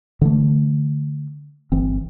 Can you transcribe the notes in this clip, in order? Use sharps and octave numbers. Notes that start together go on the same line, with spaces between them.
D3 E3 A3
G1 E3 C4